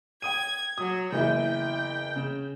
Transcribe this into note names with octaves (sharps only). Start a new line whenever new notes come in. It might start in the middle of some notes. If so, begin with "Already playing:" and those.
G5 D#6 G#6 D#7
F#3 D#6
F#1 E2 E4 G5
C#3